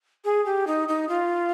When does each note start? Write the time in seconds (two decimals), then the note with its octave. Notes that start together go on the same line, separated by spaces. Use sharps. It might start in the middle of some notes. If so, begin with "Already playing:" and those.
0.25 G#4
0.46 G4
0.67 D#4
0.89 D#4
1.09 F4